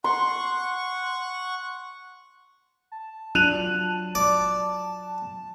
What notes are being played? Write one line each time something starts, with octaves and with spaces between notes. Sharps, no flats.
F#5 C6 C#6
A5
F#3 D4 F4 F#6 D#7 F7
D5